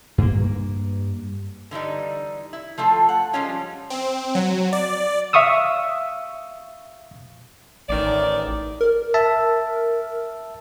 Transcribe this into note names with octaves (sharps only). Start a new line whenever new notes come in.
G2 A#3
D3 E3 G3 D#4
E4
F3 A3 F4 A4
F#5
F3 G3 G#3 C#4 F4
C4
F#3
D5
E5 F5 C#6 D#6 E6
A1 D#3 D5
A#4
E5 A5